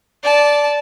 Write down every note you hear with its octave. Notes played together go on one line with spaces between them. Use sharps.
D5 A5